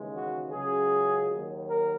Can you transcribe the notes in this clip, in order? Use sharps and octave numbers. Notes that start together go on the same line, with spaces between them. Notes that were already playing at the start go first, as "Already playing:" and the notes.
Already playing: D#2 C#3 E3 G#3
F#4
C#2 C#3 F#3 G#4
D#2 D#3 F#3
A#4